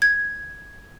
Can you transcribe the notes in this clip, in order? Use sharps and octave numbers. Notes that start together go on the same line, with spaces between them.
G#6